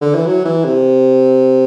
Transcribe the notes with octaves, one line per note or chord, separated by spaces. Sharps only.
D3
E3
F#3
E3
C3